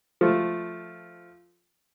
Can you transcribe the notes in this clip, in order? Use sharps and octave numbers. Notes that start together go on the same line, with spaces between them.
F3 A3